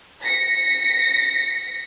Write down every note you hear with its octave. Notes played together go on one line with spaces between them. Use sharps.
A#6 B6 C#7